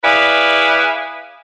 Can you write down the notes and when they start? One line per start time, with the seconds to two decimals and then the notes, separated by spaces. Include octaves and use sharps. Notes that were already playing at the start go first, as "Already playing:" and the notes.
0.03 E4 G#4 B4 D5 F5